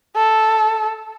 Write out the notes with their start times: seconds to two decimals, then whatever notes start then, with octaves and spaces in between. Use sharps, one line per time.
0.17 A4